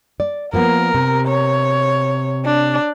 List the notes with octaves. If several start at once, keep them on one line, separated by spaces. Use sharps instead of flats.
D5
F3 A#3 B3 A#4
C3
C#5
D4